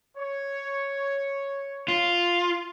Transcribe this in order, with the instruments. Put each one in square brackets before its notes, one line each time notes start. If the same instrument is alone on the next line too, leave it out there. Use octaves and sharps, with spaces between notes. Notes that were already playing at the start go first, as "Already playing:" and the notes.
[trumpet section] C#5
[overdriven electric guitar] F4